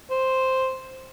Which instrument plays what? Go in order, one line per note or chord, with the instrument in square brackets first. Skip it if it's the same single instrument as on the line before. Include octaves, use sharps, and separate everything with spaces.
[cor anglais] C5